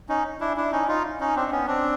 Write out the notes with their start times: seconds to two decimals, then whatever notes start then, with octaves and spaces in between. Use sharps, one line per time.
0.09 C#4 D#4
0.40 D4 E4
0.57 D4 E4
0.72 C#4 D#4
0.88 D#4 F4
1.21 C#4 D#4
1.36 C4 D4
1.52 B3 C#4
1.68 C4 D4